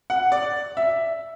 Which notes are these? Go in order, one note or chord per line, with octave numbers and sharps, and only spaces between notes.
F#5
D5
E5